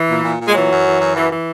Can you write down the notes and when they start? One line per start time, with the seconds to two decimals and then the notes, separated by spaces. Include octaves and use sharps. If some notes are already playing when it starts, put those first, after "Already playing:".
Already playing: E3
0.09 A#2
0.24 A#2
0.39 A#2
0.47 G#3
0.55 E3 F#3
0.69 F#2
0.86 E3
1.01 F#2
1.15 E3
1.31 E3